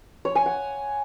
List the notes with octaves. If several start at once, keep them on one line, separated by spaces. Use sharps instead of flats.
C#5
G#5
F#5